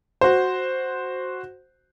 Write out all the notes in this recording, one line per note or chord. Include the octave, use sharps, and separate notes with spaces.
F#4 C5